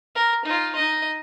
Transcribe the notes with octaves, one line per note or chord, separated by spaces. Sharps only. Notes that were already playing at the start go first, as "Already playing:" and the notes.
A#4
D#4 F4
D#4 D#5